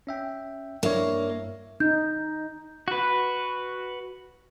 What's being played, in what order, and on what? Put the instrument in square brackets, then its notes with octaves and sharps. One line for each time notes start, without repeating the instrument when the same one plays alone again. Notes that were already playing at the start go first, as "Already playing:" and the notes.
[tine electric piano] C#4 E5 G5
[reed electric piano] G2 E5 [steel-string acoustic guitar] A#3 [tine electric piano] D4 E4 C#5
[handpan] D#4 [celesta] G6
[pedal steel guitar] F#4 B4